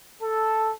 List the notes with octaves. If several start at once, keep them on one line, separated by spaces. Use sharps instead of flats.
A4